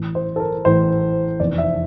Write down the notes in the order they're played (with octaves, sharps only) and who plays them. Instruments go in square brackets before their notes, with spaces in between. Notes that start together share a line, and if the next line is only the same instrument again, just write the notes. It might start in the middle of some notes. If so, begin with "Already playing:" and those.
Already playing: [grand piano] A1 A2 E3
C5
A4
A#4
A1 A2 E3 C5
F1 E2 E3 D5
E5